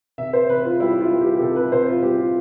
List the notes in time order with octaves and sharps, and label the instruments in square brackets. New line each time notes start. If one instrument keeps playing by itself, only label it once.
[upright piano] C3 E5
C5
C3 B4
F4
G3 E4
F4
G3
G4
G4
C3 A4
B4
C3 C5
F4
G3 G4
F4